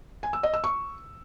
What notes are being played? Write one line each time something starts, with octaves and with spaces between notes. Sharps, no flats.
G#5
E6
D#5
E6
C#6